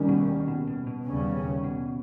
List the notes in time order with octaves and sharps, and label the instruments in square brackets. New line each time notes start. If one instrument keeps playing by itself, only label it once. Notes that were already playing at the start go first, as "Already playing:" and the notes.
Already playing: [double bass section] D#2 D#3 G3 C#4
[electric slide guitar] B2
B2
B2
B2
[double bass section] D#2 C#3 G3 C#4
[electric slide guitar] B2